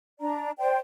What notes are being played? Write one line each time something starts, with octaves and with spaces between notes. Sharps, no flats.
D4 D5 A#5
C5 D5 G5